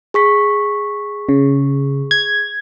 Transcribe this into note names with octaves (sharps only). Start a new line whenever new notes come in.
G#4 C#6 B6
C#3
G#6